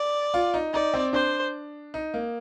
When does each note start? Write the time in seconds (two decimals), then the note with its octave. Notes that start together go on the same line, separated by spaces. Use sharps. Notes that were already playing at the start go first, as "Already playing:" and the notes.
Already playing: D5
0.34 F4
0.54 D#4
0.74 D#4 D5
0.94 C4
1.13 D4 C5
1.94 D#4
2.14 A#3